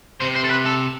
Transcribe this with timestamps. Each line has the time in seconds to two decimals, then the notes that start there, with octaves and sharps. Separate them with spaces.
0.21 C3 C5
0.36 C5
0.45 A4
0.51 B4
0.66 A4